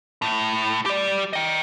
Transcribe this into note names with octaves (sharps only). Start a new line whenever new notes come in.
A2
G4 D5
D#5 G5